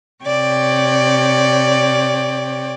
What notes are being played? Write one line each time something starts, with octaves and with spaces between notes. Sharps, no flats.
C3 C#5 D5 G5